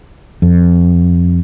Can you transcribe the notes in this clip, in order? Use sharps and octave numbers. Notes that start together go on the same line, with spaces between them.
F2